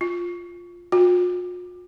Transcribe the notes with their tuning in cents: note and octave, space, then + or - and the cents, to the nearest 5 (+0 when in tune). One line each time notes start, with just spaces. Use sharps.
F4 +5
F4 +45